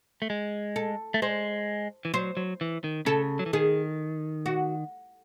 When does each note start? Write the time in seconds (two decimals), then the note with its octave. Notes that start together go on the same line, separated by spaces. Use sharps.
0.22 A3
0.30 G#3
0.76 A4
1.14 A3
1.22 G#3 C5
2.05 E3
2.14 F#3 C5
2.37 F#3
2.61 E3
2.84 D#3
3.06 C#3 A4
3.39 F#3
3.46 E3
3.53 D#3 G#4
4.46 F#4